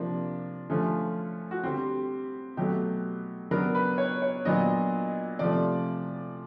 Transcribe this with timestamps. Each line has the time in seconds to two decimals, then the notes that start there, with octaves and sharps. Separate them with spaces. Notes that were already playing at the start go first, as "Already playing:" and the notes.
Already playing: C3 F3 A#3 D4
0.70 D3 F3 A3 C#4
1.51 F#4
1.63 D3 G3 C4 G4
2.57 B2 F#3 A3 G4
3.51 C#3 F#3 B3 D4 A#4
3.75 B4
3.98 C#5
4.22 C#5
4.45 A#2 F#3 B3 D4 D#5
5.39 C3 F3 A3 D5